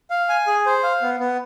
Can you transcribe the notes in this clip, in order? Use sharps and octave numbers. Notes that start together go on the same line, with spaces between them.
F5
G#5
G#4
C5
F5
B3
B3